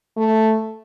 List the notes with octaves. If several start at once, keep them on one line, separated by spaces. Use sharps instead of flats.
A3